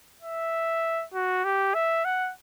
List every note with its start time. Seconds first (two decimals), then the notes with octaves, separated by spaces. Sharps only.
0.22 E5
1.14 F#4
1.44 G4
1.74 E5
2.05 F#5